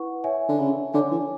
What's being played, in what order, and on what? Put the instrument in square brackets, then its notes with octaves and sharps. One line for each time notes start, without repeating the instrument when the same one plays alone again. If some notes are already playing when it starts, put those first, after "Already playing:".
Already playing: [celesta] E4 B4 F#5 C#6
C#5 E5 G#5
[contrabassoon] D3
C#3
[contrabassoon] D3 [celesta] C#5 G#5 D6
[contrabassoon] E3